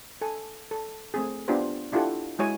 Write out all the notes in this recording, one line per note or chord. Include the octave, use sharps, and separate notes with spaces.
A4 G#5
A4
A3 C4 G#4
B3 D4 F4 G4 C5
D4 E4 F4 G4 A4 F#5
G#3 E4 F#4 C#5 G#5